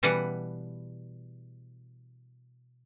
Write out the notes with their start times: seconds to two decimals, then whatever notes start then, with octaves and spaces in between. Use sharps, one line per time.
0.03 B2 E3 G3 B4 F#5